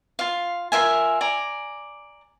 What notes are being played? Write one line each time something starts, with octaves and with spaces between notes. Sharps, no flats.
F4 F5
F4 A#4 E5 G#5
D5 G#5 A#5